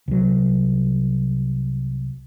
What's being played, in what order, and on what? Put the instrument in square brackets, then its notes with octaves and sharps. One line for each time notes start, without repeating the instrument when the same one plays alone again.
[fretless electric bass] C2 F#3